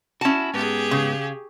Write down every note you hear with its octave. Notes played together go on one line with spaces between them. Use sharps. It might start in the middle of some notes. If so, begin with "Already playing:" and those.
C#4 E4 F#4 A5
G#2 B3 G4 G#4
C#3